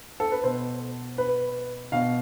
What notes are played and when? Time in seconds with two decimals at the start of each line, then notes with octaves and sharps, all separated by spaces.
0.20 A4
0.32 B4
0.44 B2 C5
1.18 B4
1.92 B2 F5